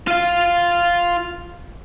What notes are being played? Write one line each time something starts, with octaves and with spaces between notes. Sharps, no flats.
F4 F5